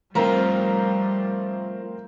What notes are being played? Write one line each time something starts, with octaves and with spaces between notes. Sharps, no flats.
F3 G3 A3 C4 F4 A#4 A#5